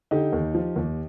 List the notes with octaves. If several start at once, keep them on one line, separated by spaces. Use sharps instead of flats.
D3 D#4 G4
D#2
F3
D#2